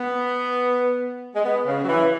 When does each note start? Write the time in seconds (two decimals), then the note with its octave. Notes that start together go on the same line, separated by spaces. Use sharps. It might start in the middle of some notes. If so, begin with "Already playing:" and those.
Already playing: B3
1.35 G#3
1.44 B3
1.66 C#3
1.84 F#3
1.89 E3